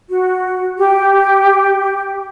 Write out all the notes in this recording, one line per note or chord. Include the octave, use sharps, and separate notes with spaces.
F#4
G4